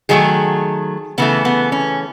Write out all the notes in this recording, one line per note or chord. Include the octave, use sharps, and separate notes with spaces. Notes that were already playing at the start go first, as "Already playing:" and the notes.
D#3 F#3 A3 G#4
C#3 E3 A3 B3
B3
C#4